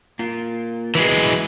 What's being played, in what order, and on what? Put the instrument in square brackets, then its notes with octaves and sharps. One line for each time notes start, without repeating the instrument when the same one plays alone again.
[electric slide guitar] A#3 F4
[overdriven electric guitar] E3 G#3 [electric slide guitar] F#4 B4